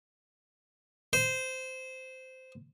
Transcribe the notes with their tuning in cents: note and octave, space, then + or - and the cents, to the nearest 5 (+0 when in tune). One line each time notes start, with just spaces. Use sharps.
C5 -15